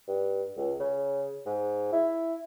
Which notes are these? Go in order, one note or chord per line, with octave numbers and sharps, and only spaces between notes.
G2
C#2
C#3
G#2
E4